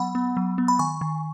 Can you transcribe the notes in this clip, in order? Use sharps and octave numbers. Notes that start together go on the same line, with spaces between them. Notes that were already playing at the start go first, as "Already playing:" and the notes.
Already playing: F#3 B3 F#5 B5
B3
F#3
B3
B5
D#3 G#5 C#6
D#3